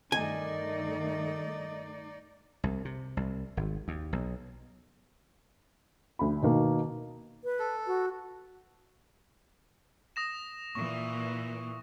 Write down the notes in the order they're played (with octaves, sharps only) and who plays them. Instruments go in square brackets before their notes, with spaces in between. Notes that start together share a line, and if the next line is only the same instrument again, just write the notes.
[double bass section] G2 D#3 A3 [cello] D#4 D5 [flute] D#5 [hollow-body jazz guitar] G#5
[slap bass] C2
C3
C2
G#1
D#2
B1
[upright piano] D2 B5
B2 D#3 A#3
[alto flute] B4
[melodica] A4
[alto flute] F#4
[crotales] D#6 A#6 E7
[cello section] A#2 E3 [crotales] C#6